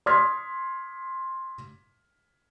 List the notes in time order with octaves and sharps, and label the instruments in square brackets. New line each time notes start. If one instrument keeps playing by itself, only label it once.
[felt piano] C6 D6 D#6 F6 G#6 B6